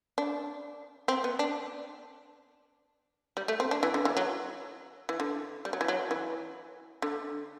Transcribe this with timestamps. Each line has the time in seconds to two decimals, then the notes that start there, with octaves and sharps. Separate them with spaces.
0.18 D4
1.08 C4
1.24 B3
1.39 D4
3.37 G3
3.48 A3
3.60 C4
3.71 D4
3.83 E3
3.94 D3
4.05 E3
4.17 F#3
5.09 E3
5.20 D3
5.65 G3
5.73 F#3
5.81 E3
5.88 F#3
6.11 E3
7.02 D3